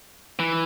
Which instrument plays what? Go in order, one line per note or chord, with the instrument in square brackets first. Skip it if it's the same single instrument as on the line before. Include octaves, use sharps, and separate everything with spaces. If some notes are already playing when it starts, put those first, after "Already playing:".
[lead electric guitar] E3